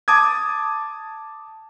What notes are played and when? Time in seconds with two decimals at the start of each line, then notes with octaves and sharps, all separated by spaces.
0.08 A5 D6 D#6 G#6